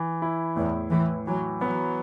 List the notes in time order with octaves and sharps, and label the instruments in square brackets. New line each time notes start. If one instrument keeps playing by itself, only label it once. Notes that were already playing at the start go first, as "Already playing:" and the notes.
Already playing: [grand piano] E3
E4
[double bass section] E2 [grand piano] A2
[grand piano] A2 [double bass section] E3
[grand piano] E3 [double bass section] F#3
[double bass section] F#3 [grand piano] B3